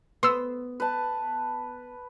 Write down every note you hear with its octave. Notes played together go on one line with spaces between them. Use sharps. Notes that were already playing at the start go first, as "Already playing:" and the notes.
B3 C6 E6
B4 A5